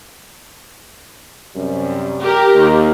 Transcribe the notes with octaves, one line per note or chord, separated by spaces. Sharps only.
F#2 C3 G3
G4 A#4
D#2